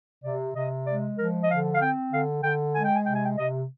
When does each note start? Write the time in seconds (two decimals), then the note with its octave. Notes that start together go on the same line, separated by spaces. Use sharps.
0.24 C3 D5
0.55 C3 D#5
0.86 G#3 D5
1.18 F3 A#4
1.43 D#5
1.49 D3 F5
1.74 F5
1.80 C4 G5
2.12 D3 F5
2.43 D3 G5
2.74 G#3 G#5
2.84 G5
2.95 G#5
3.06 C3 G5
3.15 G#5
3.24 G5
3.37 C3 D#5